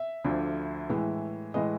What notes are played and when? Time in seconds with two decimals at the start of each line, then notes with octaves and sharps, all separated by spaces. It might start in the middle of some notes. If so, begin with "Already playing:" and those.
Already playing: E5
0.24 D2 D3 F3
0.89 A2 E3 G#3
1.54 A2 E3 G#3 D#5